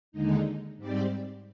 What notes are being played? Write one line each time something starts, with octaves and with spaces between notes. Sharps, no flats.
D#2 D3 G#3 D#4
G#2 G3 C4 G4 D5